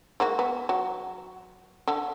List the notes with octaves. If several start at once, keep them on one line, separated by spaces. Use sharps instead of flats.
G#3 A#3 F#4
B3
F#3
D3